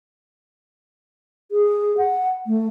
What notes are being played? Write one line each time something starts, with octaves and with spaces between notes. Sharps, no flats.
G#4
F#5
A3